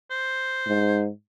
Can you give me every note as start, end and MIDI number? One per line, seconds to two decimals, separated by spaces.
0.10 1.02 72
0.67 1.09 44